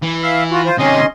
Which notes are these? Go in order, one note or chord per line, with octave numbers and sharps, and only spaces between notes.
E3
E5 F5
F4 F#4
F4 C5
C3 D#3 C#4 D#5 C6